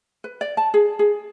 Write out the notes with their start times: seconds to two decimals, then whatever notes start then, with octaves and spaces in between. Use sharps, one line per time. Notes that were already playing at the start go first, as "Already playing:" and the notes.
0.24 B4
0.41 D5
0.57 A5
0.74 G#4
0.99 G#4